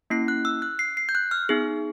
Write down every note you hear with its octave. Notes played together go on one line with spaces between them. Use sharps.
A#3 C#4 E4 C7
F#6
E6
F#6
C7
C7
G6
F#6
F6
B3 D#4 G#4